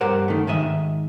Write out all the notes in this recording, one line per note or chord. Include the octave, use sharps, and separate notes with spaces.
G2 G4 A#4 C5 F#5
D#3 A3
G#2 D#3 D#5 E5